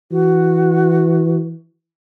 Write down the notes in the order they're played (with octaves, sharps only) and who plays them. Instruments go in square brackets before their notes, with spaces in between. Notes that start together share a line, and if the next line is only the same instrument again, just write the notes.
[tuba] E3 [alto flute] F#4